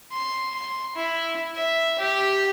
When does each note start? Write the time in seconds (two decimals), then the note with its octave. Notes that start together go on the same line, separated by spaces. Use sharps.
0.12 C6
0.55 C6
0.96 E4
1.56 E5
2.00 G4